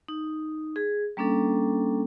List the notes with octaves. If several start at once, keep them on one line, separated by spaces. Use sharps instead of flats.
D#4
G#4
G3 A#3 C#4 D4 A4